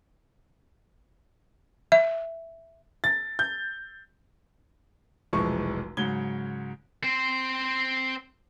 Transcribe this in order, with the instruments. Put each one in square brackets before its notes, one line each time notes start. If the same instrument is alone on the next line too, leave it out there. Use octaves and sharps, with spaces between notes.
[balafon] E5
[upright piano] A6
G6
[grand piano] F1 B1 E3 F3 G#3 C#6
G#2 C#3 F#3 G#6 G7
[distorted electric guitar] C4 C5